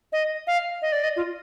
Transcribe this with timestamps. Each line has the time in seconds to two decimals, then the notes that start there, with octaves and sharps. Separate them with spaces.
0.12 D#5
0.47 F5
0.82 D#5
0.92 D5
1.04 D#5
1.16 F4